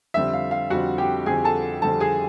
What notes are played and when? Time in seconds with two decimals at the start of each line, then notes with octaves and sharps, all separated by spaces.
0.14 F2 D3 G3 C4 E5
0.34 F5
0.51 F5
0.70 F2 D3 G3 C4 F#4 F#5
0.98 G4 G5
1.26 F2 D3 G3 C4 G#4 G#5
1.44 A4 A5
1.82 F2 D3 G3 C4 A4 A5
2.00 G#4 G#5